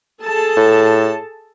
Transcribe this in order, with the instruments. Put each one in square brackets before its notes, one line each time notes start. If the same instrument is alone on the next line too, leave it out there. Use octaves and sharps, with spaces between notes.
[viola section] G#4 A4 A5
[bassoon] A2